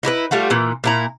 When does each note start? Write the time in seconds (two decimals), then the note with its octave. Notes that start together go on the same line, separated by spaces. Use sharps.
0.03 D#4 E4 G4 B4
0.31 G3 A3 F4 F#4
0.50 A#2 E3
0.84 A#2 E4 A#5